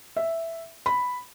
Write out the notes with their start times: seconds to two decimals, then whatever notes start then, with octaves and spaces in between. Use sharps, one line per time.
0.16 E5
0.86 B5